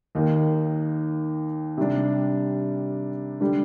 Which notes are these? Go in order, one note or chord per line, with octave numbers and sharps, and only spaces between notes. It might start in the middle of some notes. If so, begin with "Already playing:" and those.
D#2 D#3 A#3 D#4
C3 G3 D4
D3 G3 D4